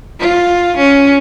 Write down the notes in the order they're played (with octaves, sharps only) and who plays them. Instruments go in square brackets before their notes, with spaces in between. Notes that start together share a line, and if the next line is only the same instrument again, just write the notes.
[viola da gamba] F4
C#4